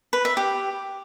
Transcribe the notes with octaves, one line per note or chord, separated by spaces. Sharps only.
B4
E5
G4